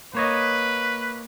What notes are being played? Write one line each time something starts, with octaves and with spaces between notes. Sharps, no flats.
A#3 B4 C#5 D#5